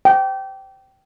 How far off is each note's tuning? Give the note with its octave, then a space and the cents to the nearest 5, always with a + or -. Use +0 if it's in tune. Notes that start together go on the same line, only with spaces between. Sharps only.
G5 -20